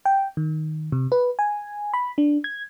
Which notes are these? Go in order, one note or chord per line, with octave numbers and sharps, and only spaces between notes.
G5
D#3
C3
B4
G#5
B5
D4
G#6